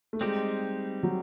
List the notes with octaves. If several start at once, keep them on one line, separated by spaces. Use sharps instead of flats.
A3
G3 G#3 C4 D#4 G4
F#3